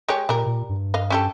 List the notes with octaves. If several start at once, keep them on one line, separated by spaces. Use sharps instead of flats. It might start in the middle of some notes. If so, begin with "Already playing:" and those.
G#3 G4 C#5
A#2 G3 A#4
A#2
G2
D#5 F5
C#4 G4 A4